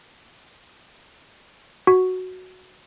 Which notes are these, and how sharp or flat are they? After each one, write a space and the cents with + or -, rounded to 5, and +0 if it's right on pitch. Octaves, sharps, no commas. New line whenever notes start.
F#4 +0